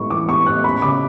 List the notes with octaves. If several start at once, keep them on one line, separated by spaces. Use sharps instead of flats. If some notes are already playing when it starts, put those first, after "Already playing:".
Already playing: A2 G#3 B3 B5 C#6
E3 D6
B3 C#6
A2 F#6
C#4 B5
C#3 D6